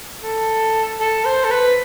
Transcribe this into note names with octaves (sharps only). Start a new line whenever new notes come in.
A4
A4
C5
A4
B4